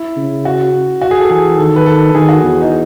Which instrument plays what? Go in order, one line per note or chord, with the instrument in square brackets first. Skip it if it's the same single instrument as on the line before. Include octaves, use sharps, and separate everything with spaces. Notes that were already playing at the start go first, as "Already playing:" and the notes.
Already playing: [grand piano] E4
[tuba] C#3
[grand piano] F#4
F#4
G#4
A4
[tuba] E3 [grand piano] G#4
[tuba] D#3 [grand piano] A4
[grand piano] B4
A4
[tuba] D#3 [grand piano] G#4
[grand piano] F#4
[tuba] E2
[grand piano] D#4